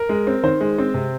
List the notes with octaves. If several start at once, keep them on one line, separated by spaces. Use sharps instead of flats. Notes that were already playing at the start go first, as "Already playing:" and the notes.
Already playing: A#4
G#3
C4
D#3 C5
G#3
C4
C3